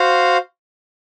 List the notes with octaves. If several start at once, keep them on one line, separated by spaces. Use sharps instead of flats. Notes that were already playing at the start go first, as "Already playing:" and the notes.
Already playing: F#4 C5 F5